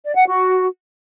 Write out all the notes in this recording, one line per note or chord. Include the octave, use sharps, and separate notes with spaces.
D5
F#5
F#4